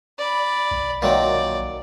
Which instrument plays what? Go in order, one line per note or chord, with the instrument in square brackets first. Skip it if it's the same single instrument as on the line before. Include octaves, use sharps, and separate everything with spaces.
[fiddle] D5 B5
[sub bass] B1
[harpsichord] A#2 D#3 F#3 [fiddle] D5